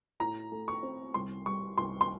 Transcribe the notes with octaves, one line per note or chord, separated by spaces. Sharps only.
A2 A#5
A3
C#6
C4
C2 C6
G3 C#6
C2 C6
C6